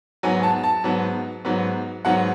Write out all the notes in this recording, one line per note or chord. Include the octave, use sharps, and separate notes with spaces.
G#2 F#3 B3 G#5
A5
A5
G#2 F#3 B3
G#2 F#3 B3
G#2 F#3 B3 F#5